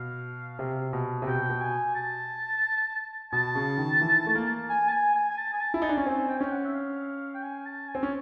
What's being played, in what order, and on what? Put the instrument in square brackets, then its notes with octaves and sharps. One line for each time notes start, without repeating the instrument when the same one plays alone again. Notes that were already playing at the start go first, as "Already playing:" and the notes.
Already playing: [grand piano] B2 [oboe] F5
[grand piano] C3
B2
C3
[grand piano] B2 [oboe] G5
[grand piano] B2
[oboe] G#5
A5
[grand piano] B2 [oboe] A5
[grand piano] C#3
D#3
E3
A3
A#3
[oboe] G#5
A5
G#5
G#5
G#5
A5
G#5
A5
[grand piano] E4
[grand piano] D#4 [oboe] G#5
[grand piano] D4
C#4
[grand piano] C4 [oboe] G#5
[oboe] G5
G#5
[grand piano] C#4 [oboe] G5
[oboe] F#5
E5
F5
G5
G#5
A5
G#5
[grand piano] C4
C#4